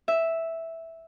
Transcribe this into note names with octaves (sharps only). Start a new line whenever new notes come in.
E5